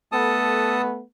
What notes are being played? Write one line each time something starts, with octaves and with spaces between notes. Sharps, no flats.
A3 B3 A4 A5 D#6